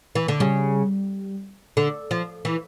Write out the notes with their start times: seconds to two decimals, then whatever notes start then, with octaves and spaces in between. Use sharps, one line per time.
0.15 E3
0.28 D3
0.40 C#3 G3
1.77 D3
2.11 F3
2.45 E3